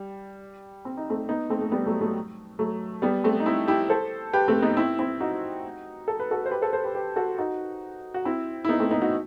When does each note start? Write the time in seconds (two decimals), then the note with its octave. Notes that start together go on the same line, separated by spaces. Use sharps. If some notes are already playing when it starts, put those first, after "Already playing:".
Already playing: G3
0.85 C4
0.97 D#4
1.10 A3 C4
1.29 B3 D#4
1.50 A3 C4
1.61 A3
1.72 G3 B3
1.86 F#3 A3
2.01 F#3 A3
2.59 F#3 A3
3.02 G3 B3
3.24 A3 C4
3.40 D#4
3.46 C4 E4
3.68 E4 G4
3.89 A4 C5
4.33 G4 B4
4.48 A3 C4
4.62 B3 D#4
4.77 C4 E4
4.99 C4 E4
5.21 D#4 F#4
6.08 A4
6.20 B4
6.31 F#4 A4
6.46 C5
6.51 G4 B4
6.62 A4 C5
6.73 A4 C5
6.84 G4 B4
6.95 G4 B4
7.16 F#4 A4
7.38 D#4 F#4
8.14 F#4
8.25 C4 E4
8.65 E4
8.69 B3 D#4
8.80 A3 C4
8.91 B3 D#4
9.02 D#4 F#4